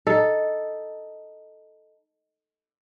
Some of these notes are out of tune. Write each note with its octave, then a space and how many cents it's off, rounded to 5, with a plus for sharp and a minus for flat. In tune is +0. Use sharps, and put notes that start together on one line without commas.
D#4 +0 A4 +0